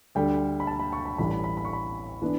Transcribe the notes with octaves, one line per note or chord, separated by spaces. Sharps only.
D2 D3 G3 G5
B5
A5
B5
C#6
B5
A1 A2 E3 G3 B5
B5
B5
B5
C#6
B5
E3 B3 D4